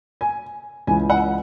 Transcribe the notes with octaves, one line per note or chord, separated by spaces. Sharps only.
G#5
C#2 C#3 E3 G#5
F#5